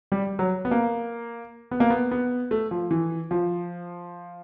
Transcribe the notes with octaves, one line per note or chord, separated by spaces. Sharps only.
G3
F#3
B3
A#3
B3
A#3
B3
B3
A3
F3
E3
F3